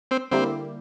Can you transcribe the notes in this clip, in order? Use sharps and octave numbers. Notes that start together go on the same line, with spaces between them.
C4
D3 G3 A#3 C4 E4 G4